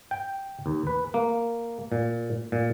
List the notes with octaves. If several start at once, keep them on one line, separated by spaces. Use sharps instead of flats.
G5
D#2
B4
A#3
A#2
A#2